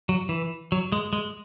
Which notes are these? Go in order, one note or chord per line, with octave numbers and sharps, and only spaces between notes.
F#3
E3
F#3
G#3
G#3